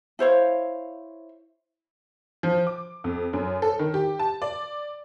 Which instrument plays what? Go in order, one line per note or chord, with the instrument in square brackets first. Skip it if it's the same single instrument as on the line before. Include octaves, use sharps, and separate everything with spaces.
[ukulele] E4 C5 C#5 F5
[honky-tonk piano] F3
D6
F2
F#2
A4
D#3
G4
A5
D5